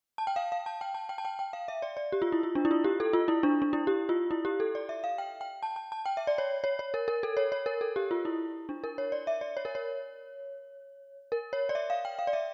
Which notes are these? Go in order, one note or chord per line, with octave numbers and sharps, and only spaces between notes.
A5
G5
F5
F5
A5
G5
A5
G5
A5
G5
G5
F5
E5
D5
D5
G4
F4
E4
F4
D4
E4
F4
G4
A4
F4
E4
D4
D4
E4
G4
F4
E4
G4
A4
D5
E5
F5
G5
G5
A5
A5
A5
G5
E5
D5
C#5
C#5
C#5
A#4
A#4
A4
C#5
C#5
A#4
A4
G4
F4
E4
D4
A#4
C#5
D5
E5
D5
C#5
A#4
C#5
A#4
C#5
D5
E5
F5
G5
F5
D5
E5